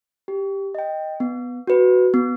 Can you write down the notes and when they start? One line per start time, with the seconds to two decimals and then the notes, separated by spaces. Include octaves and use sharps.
0.28 G4
0.75 D#5 G5
1.20 B3
1.67 F#4 B4
2.14 B3